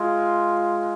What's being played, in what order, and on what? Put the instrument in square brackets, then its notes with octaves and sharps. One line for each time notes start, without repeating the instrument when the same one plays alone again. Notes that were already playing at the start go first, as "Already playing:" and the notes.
Already playing: [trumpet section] G#3 F4